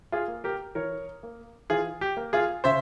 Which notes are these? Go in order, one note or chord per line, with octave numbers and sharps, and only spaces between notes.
F4 G#4
A#3
G4 A#4
E3 A#4 C#5
A#3
E3 F4 G#4
G4
A#3
F4 G#4
C#3 C5 E5